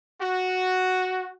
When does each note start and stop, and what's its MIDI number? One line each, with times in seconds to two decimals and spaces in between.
0.21 1.32 66